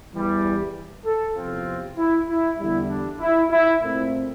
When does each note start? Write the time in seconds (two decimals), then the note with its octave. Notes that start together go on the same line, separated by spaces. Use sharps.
0.13 E2 E3 G3
1.05 A4
1.36 E2 C3 F3 C4 F4
1.97 E4
2.28 E4
2.58 E2 D3 G3 E4
2.89 D4
3.20 E4
3.51 E4
3.81 A#2 A3 C4 E4